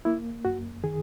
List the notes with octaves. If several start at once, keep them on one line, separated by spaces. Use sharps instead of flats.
A#3 E4
F#2 F#4
D#3 G#4